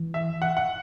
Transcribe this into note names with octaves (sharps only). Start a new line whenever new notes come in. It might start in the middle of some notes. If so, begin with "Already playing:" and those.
Already playing: E3
E5
F#5
F#5